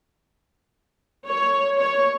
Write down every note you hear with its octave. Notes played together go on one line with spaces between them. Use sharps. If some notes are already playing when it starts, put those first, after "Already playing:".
C#5
C#5